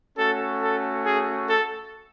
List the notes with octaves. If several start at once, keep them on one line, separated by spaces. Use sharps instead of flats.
A3 C#4 F#4 A4
A4
G#4
A4